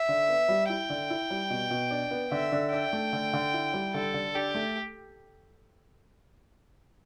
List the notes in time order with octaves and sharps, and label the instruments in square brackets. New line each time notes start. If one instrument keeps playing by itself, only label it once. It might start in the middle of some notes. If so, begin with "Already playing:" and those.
Already playing: [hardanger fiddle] E5
[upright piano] D3
B3
G3
[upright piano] E4 [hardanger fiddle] G5
[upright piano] D3
E4
G3
B2
B2
D4
B3
[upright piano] D3 [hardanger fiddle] E5
[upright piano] D3
[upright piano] D4 [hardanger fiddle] G5
[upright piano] A3
D3
D3
E4
G3
[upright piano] D3 [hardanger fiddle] A4
[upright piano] D3
[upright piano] D4 [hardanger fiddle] G4
[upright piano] A3